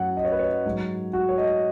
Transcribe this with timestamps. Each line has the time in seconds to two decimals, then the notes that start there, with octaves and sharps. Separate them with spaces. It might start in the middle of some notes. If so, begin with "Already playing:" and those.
Already playing: F#2 F#3 F#5
0.17 D#5
0.25 C#5
0.32 B4
0.39 C#5
0.65 G#2 F#3
1.13 F#4
1.29 C#5
1.38 D#5